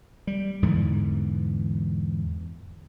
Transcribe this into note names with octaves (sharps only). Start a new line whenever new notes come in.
G3
E2 G#2 D3 E3